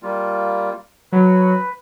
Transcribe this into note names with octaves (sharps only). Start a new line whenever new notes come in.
G3 A#3 F4
F#3 B4